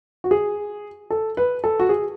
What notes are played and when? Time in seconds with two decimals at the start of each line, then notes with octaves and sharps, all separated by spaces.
0.24 F#4
0.31 G#4
1.10 A4
1.37 B4
1.64 A4
1.80 F#4
1.89 G#4